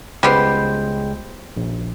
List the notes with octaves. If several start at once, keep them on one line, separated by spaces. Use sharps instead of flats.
C#2 G3 G#3 B3 C5 G5
A#1